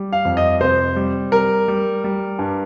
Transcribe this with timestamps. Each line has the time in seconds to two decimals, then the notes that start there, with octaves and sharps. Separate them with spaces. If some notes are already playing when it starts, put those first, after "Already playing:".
Already playing: G3
0.13 F5
0.25 F2
0.37 D#5
0.60 C3 C5
0.96 G3
1.32 G3 A#4
1.68 G3
2.04 G3
2.39 G2